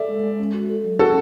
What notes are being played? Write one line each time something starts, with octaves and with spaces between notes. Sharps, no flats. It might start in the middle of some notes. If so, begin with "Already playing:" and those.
Already playing: A4 D5 E5
G#3
G#3
C#4
F#4
A4
F#3
C#4 F#4 A4